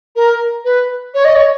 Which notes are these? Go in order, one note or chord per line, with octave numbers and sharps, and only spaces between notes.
A#4
B4
C#5
D#5
C#5